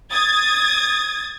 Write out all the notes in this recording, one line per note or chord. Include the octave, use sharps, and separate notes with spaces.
D#6 G#6 A6